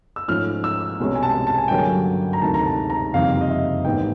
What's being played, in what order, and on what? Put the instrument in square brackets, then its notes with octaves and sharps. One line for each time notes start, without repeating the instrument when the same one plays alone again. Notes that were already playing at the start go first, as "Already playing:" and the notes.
[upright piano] E6
G#2 F3 A3 C#4 F6
E6
C2 B2 G#3 C#4
G#5
A5
A5
G#5
G2 D3 F#3 A#3 C#4 G5
G#5
A#5
D2 C3 D#3 G#3 A5
A#5
A5
A#5
F#1 F2 C3 D#3 G3 F5
D#5
E5
A1 G#2 D#3 G#3 B3 G5